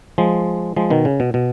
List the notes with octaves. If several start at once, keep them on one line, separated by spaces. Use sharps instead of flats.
F3 G#3
F3 G#3
B2 D#3
C#3
B2
B2